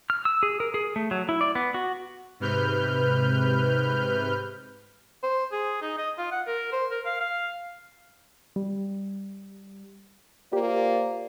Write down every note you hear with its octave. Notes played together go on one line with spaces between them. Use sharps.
F6
E6
G#4
A#4
G#4
A3
F#3
E4
D5
B3
F#4
G#2 C3 B4 F6 G6
C5
G#4
D#4
D#5
F4
F#5
A#4
C5
A#4
F5
F5
G3
A#3 F4 G4 C5 D5